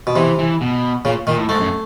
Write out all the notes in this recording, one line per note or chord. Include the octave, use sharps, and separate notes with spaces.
B2
C3 E3
E3
B2
A#2 C#3
A#2 D#3
A2
G#2 A3
F#2